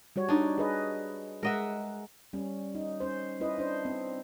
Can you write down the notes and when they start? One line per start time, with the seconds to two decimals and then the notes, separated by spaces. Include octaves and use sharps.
0.16 G3 F#4 C#5
0.29 D4 D#4
0.58 G#4 B4 D#5
1.43 G#3 A#4 D#5 E5 F#5
2.33 G3 C#4
2.75 D#4
3.00 C#4 C5
3.40 C#4 E4 B4 D#5
3.58 D4 C5
3.85 C4